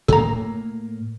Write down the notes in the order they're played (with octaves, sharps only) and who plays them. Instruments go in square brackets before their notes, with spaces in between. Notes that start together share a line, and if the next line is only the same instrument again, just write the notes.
[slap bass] A2 A#3 [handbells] A4 A#5